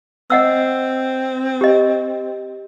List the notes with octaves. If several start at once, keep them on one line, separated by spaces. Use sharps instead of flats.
C4 D#5 F#5 E6
G4 D#5